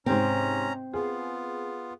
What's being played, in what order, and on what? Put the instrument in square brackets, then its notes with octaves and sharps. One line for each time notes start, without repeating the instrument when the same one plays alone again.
[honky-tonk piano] G#2 C3 [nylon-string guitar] C4 [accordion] C#4 A#5
[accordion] B3 F4 [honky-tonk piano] G#4